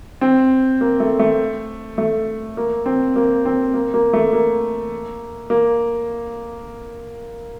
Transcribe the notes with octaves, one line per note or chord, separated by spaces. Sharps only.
C4
A#3
A3
A3
A3
A#3
C4
A#3
C4
A#3
A#3
A3
A#3
A#3